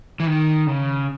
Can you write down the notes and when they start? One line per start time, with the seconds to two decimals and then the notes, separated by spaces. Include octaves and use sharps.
0.20 E3
0.27 D#3
0.67 C#3